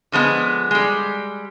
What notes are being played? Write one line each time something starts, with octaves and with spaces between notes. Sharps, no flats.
D3 F3 G#3 B3
G3 G#3